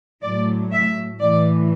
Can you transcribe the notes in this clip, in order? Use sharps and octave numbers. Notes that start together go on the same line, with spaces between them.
A2 F#3 D5
E5
A2 E3 D5